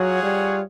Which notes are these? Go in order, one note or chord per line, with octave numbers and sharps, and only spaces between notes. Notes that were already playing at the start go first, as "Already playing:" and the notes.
Already playing: F#3 F4 G#4 C#5 F#5
G3